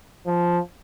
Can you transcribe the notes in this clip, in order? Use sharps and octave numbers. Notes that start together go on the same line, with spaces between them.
F3